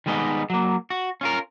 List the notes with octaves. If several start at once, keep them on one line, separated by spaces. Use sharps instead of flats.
D#3 G3 G#3 B3 D#4
F#3 A#3
F#4
C#4 F4 A#4